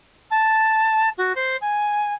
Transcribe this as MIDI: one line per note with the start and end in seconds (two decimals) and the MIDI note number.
0.30 1.09 81
1.17 1.32 66
1.35 1.56 72
1.61 2.13 80